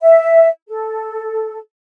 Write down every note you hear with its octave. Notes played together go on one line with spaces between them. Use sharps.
E5
A4